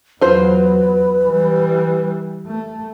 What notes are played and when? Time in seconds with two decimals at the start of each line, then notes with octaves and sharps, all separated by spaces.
0.21 E2 F#3 F4 B4 C5
1.24 E3 G3
2.47 A3